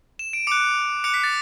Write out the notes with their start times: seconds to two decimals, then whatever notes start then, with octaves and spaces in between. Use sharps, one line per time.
0.19 E7
0.33 D7
0.47 D6 F#6 C#7
1.04 D6 F#6 C#7
1.14 B6
1.24 A6